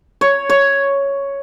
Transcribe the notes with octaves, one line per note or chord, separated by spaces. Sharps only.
C#5
C#5